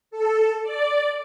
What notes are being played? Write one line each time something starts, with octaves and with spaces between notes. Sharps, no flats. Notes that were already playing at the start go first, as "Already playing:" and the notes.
A4
D5